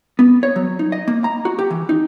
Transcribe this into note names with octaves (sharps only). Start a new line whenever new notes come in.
B3
C#5
F#3
D#4
D#5
A#3
A#5
F#4
G4
E3
D#4